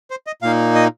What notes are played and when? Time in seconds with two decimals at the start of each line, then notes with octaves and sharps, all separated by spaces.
0.11 C5
0.27 D#5
0.42 A#2 A#3 D#4 F5
0.75 D#5